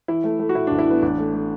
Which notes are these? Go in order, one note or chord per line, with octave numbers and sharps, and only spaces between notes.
E3 E4
A3
A3
F#4
A2 E4
A1 D4
E4
E3 B3
A1 D4
A3
A3